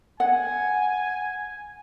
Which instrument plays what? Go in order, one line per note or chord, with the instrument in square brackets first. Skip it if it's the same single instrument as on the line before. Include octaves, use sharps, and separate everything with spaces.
[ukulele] F#5 [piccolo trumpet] G#5